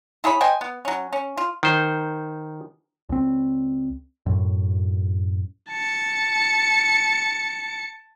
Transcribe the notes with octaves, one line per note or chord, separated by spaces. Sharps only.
E4 G#4 C#5 B5
C5 D#5 G5 G#5
B3
F#3 C#4
C#4
F4
D#3 C5
C#2 C4
F#2 A2
A5 C#7